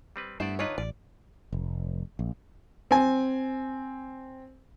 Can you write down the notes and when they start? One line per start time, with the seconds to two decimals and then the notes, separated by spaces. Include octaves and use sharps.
0.16 G3 C4 B4
0.40 G2 A3 B3 E4 C5 D5
0.59 D3 D#4 F4 B4 C#5
0.78 A1 D5
1.52 F1
2.19 A#1
2.91 C4 G#5